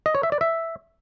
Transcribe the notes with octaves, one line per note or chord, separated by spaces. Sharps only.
D#5
C#5
E5
D5
E5